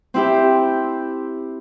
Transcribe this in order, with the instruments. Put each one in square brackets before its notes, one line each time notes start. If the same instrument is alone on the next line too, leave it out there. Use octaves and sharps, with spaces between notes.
[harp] C4 E4 G4